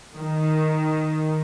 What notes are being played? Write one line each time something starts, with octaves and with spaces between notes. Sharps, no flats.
D#3